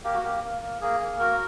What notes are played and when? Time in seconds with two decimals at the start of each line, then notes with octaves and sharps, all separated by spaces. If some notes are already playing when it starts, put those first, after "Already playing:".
0.04 A#3 G4
0.14 F#4
0.23 A#3 G4
0.43 A#3
0.61 A#3
0.81 A#3 G#4
1.00 A#3
1.19 F#4 A#4